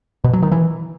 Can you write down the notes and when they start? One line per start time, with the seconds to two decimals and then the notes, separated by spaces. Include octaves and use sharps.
0.24 B2
0.33 F#3
0.42 D#3
0.52 E3